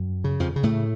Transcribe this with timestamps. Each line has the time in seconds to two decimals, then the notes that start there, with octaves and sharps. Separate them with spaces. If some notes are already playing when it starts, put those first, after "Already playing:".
Already playing: F#2
0.24 C#3
0.40 F2 F3
0.56 C#3
0.63 A2 A3